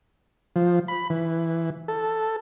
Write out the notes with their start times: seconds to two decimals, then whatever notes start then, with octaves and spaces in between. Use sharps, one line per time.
0.56 F3
0.88 B5
1.10 E3
1.88 A4